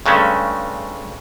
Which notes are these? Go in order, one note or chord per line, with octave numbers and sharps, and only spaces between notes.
G2 C#3 G#3 A3 C#4